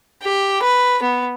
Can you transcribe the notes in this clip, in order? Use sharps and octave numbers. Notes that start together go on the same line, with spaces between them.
G4
B4
B3